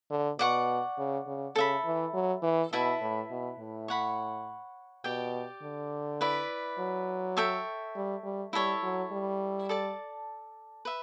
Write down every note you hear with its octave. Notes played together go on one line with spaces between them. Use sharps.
D3
B2 D5 F#5 C#6
C#3
C#3
C#3 A4 E5 B5
E3
F#3
E3
B2 E4 B4 E5 A5
A2
B2
A2
C#5 F#5 B5
B2 G4 D5 G5
D3
E4 B4 D5
F#3
A4 C#5 E5 G5
G3
G3
G3 E4 A4 C#5
F#3
G3
A4 D5 A5
B4 E5